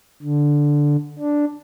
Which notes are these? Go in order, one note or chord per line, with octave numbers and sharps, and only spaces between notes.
D3
D4